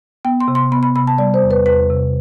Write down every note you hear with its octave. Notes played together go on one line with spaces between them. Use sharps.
B3 G5
C6
C3
C6
B3 B5
B5
C3 B5
A5
G3 D5
C5
E2
B4
E2 B4
C3